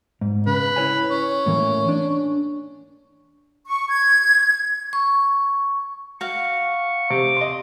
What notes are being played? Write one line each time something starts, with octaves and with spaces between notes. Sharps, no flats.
G#2
C#3 B4
E4 C#5 G#5
C#4
A2 E3 A#3
D4
C#6
G#6
C#6
F#4 F5 C#6
C3 D6
D#5 C6